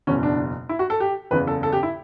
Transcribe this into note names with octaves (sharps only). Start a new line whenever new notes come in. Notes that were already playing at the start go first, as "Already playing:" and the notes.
F#1 E2 B2 C#4
D4
E4
F#4
A4
G4
F#1 E2 C#3 B4
A4
A4
G4
E4